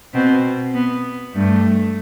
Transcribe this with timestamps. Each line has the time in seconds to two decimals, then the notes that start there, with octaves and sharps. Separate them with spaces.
0.14 B2 C4
0.74 B3
1.35 G2 A3